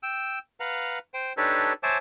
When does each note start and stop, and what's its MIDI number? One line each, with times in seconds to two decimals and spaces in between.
0.03 0.39 79
0.03 0.39 88
0.60 0.99 71
0.60 0.99 77
0.60 0.99 78
0.60 0.99 82
1.14 1.33 72
1.14 1.33 79
1.37 1.73 62
1.37 1.73 63
1.37 1.73 67
1.37 1.73 69
1.37 1.73 71
1.37 1.73 73
1.83 1.98 72
1.83 1.98 73
1.83 1.98 76
1.83 1.98 80
1.83 1.98 81
1.83 1.98 86